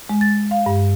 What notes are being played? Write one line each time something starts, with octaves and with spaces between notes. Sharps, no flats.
G#3
A6
F5
G2